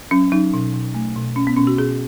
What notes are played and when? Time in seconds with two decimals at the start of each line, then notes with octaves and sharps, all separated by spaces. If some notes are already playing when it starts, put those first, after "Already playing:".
0.11 F#3 C#4
0.32 F#3 D#4
0.54 B2
0.74 B2
0.95 A3
1.16 B2
1.36 B2 C#4
1.47 B3
1.56 B2 C#4
1.67 F#4
1.78 B2 G#4